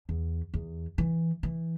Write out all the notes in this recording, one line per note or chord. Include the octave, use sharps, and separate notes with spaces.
E2
E2
E3
E3